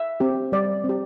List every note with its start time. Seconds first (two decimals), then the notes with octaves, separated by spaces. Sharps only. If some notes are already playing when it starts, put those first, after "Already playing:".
Already playing: E5
0.20 C4 G4
0.52 G3 D5
0.84 C4
0.89 G4